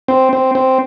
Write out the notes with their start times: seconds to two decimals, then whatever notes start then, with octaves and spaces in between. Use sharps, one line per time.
0.08 C4
0.33 C4
0.55 C4